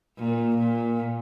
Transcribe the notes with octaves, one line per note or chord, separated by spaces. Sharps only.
A#2
A#2